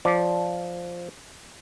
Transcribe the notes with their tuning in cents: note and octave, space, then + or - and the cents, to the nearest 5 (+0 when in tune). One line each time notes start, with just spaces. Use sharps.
F3 +0 D5 +0